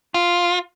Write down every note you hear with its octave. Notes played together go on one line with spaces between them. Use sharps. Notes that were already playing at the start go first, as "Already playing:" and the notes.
F4